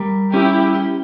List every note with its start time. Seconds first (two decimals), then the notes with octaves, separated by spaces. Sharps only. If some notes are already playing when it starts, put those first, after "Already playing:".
Already playing: G3 A#4
0.33 C#4 E4 G4
0.75 G4